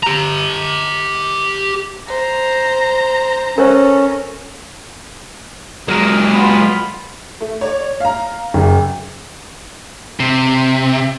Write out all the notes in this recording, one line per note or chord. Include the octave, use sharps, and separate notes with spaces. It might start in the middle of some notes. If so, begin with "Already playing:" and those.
G4 A#5
C5 A#5
C#4 A4 A#4 C5
F#3 G#3 A#4
B3 F4 B5
A3
C#5 D5
F5 A#5
F#1
C3